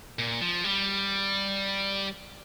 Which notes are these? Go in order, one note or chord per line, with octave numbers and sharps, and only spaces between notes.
A#2
F3
G3